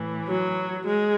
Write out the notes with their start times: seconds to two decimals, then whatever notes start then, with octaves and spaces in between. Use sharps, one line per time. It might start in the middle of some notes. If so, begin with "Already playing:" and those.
Already playing: A2 E3
0.29 F#3
0.86 G#3